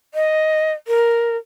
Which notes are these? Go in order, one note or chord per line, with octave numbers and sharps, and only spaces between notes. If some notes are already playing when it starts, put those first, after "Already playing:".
D#5
A#4